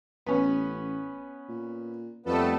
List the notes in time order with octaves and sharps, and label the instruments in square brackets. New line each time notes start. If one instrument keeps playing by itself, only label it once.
[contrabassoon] A1 [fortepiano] B3 C#4
[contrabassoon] A#2
[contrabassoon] F2 [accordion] G3 B3 B4 [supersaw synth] A3 A4